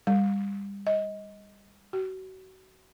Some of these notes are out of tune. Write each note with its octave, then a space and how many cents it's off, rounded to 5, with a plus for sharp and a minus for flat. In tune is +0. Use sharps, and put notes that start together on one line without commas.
G3 +30
D#5 +20
F#4 +30